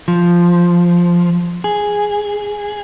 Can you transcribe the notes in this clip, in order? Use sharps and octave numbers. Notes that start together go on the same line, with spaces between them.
F3
G#4